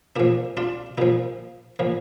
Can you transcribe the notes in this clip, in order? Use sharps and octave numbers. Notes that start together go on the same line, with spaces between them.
A#2 F3 D4
D4 F4
A#2 F3 D#4
A#2 F3